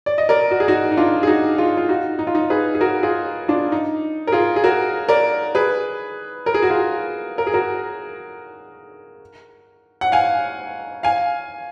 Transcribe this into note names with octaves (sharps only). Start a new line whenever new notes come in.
D5
D#5
A#4 D5
F#4
G#4
D#4 F#4
D#4
D4 F4
G#4
D#4 F#4
F4 G#4
F4
D#4 F#4
D#4
F4
D#4
G#4 B4
G#4
F#4 A#4
F4 G#4
D4 F4
D#4
A#4
F4 G#4
G#4
F#4 A#4
A#4 D5
G#4 B4
A#4
G#4
F#4
F4 G#4
A#4
G#4
F#4 A#4
F#5
F5 G#5
F5 G#5